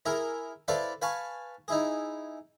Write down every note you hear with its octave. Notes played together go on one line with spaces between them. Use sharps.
E4 G#4 A#4
E4 A4 B4 C5 D5 F5
B4 F5 G#5 A5 C#6
D#4 E4 G#4